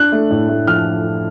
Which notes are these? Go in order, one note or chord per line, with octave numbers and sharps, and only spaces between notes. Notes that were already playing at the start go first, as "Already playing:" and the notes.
Already playing: D4 F#6
A3
A2
A3
F3 F6